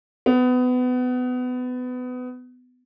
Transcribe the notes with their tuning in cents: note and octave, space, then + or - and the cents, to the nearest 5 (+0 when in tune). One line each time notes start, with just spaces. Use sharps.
B3 +25